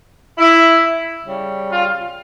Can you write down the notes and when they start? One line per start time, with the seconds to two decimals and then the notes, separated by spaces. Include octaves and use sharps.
0.38 E4
1.25 C#3 G3 C#4
1.71 F4